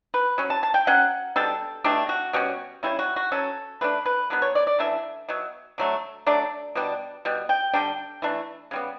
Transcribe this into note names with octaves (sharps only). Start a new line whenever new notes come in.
B4
F#3 C#4
A5
A5
G5
F#3 C#4 F#5
B2 G3 D4 A4
B2 A3 D4 G4
F#4
B2 G3 C#4 F#4
C#3 G3 C#4 E4
F#4
F#4
F#3 C#4 A4
D3 A3 D4 B4
B4
D3 F#3 B3 B4
C#5
D5
D5
C#3 E3 A3 D4 E5
B2 F#3
D3 F#3 A3
F#3 A3 D4 D5
B2 G3 D4
B2 G3
G5
D3 G3 D4 G5
E3 A3 D4
C#3 G3 B3